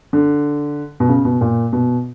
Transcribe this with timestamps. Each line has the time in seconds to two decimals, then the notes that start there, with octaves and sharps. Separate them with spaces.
0.13 D3
1.00 B2
1.09 C#3
1.25 B2
1.41 A#2
1.72 B2